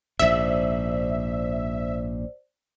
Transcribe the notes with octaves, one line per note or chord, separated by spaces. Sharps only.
A#1 G#2 C5 D5 E5